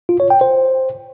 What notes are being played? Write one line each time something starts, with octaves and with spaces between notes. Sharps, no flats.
F4
C#5
G5
C5